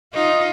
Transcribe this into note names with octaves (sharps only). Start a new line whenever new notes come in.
D#4 F4